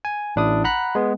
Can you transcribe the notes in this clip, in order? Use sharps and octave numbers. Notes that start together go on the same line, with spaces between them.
G#5
A1 D4 E4 D#6
F#5 A#5 B5 F#6
G#3 B3